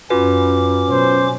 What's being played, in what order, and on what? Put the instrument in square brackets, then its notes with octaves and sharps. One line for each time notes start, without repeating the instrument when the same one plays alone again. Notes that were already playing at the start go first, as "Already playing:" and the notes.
[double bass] F#2 [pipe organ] C#4 D6 [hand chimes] F4 F#4 B4
[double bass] B2 F#3 [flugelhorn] C5